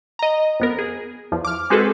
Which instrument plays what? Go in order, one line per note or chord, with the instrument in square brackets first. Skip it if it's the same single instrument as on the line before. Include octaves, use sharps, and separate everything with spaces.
[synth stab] D#5 A#5
F2 B3 A#4
G#4
E2 F3
D6 F6
G#3 C4 F#4 G#4 A4 B4